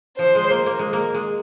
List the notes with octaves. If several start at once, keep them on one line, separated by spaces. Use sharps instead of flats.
F3 C5
G#3
A#3
A#3
G#3
A#3
G#3